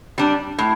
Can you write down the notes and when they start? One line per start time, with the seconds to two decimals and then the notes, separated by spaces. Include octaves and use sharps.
0.18 G3 D4
0.59 A2